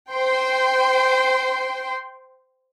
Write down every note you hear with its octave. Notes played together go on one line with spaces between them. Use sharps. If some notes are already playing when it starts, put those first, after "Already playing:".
C5 G5 C6